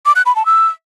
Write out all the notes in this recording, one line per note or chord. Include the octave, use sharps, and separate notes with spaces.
D6
F#6
B5
A5
E6